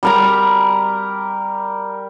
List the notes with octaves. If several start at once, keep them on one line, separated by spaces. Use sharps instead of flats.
G3 A#4 A#5